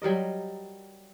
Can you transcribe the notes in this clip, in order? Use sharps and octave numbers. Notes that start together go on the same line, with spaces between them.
F#3 G3 A#4 D#5